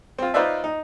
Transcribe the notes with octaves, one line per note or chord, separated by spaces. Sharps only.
C4 F4
D#4 F4 B4 C5 D5 E5
D#4